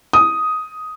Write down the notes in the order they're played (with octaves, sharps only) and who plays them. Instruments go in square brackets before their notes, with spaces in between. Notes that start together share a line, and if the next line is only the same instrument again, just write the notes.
[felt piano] D#6